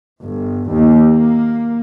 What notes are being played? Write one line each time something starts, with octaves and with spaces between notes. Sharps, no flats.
G1
D#2
A#3